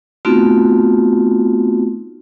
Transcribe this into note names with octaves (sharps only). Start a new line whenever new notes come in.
A3 B3 C4 D#4 F4 F#4